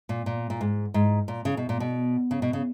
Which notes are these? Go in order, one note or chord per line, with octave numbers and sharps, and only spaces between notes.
A#2
A#2
A#2
G#2
G#2
A#2
C#3
B2
A#2
B2
C#3
B2
C#3